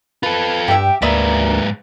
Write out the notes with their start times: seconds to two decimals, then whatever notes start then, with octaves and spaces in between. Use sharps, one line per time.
0.23 F4 A4 B4
0.68 G2 G4 E5 G5
1.02 D2 G#2 A#3 B4 D5 E5 D#6